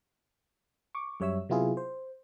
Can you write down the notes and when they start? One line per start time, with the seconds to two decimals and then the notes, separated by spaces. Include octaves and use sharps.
0.95 C#6 D6
1.20 F#2 G3 C#5 E5 E6
1.49 C3 F#3 B3 E4 F4 G#4
1.77 C5